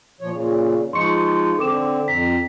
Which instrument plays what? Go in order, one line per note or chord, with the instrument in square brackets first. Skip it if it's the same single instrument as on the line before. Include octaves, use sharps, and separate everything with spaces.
[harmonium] A#2 F3 C#5
A#2 C#3
[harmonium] F3 G#3 D#4 [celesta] C6 C#6 C#7
[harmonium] D3 C4 [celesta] A4 D6 E7
[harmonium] F2 A#5 [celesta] B6